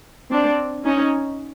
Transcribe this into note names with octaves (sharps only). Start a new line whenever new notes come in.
C4 D4
C#4 D#4